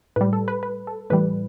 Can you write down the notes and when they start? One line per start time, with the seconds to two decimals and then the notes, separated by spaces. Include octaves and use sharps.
0.16 A2 G3 B4
0.33 A4
0.48 B4
0.63 B4
0.87 A4
1.10 A2 E3 G3 B4